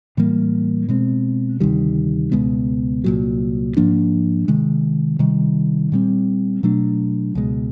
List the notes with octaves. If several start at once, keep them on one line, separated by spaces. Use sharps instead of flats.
A2 E3 G3 A#3
B2 G#3 C4
D2 C3 D#3 G3
C#2 B2 G#3 B3
C2 A#2 F#3
G#2 F3 A#3 D4
C3 D#3 G#3
C3 D#3 G3
A#2 G3 C4
B2 F#3 A3 D4
C#2 B2 G#3